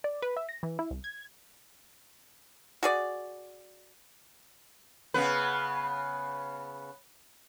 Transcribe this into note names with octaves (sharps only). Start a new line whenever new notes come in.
D5
B4
E5
A#6
E3
E4
C2
G#6
F#4 G#4 D5
C#3 B3 B4